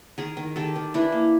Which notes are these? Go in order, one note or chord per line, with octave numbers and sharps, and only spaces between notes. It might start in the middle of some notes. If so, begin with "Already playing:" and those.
D#3 G#4 A#4
D#3
D#3 G4 A4
D#3
E3 D4 E4
A#3